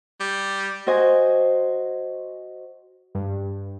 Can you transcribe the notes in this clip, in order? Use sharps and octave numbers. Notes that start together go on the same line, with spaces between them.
G3
F#4 C5 D#5 G#5
G2